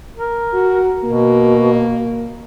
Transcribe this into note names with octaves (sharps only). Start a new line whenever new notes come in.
A#4
F#4
B2 A#3